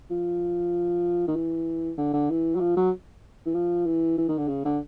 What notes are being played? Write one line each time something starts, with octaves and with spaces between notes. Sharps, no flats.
F3
D#3
E3
D3
D3
E3
F#3
F3
F#3
E3
F3
E3
E3
D#3
D3
C#3
D3